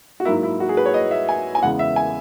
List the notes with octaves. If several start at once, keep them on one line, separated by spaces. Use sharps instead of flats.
F#4
G#2 F#3 A#3 E4
E4
F#4
G#4
B4
C#5
D#5
E5
G#5
G#5
E2 C#3 G#3 F#5
E5
G#5